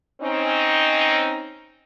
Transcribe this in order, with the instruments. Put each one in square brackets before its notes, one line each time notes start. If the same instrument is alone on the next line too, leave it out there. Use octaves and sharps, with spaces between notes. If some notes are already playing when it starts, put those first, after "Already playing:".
[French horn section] C4 C#4 D#4